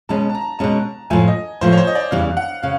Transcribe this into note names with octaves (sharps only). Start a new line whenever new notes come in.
B2 G#3 C#4 A5
A5
A#5
B2 G#3 C#4 A5
A2 F3 A3 G#5
D#5
A2 F3 A3 C5
C#5
C5
D#5
D5
E2 C#3 E3 G3 F5
F#5
C#3 F5